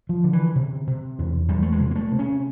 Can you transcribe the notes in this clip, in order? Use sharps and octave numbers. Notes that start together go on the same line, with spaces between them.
F3
D3
E3
C3
C3
E2
E2 G3
A3
G#3
C3
A#3
A3
C3
C#4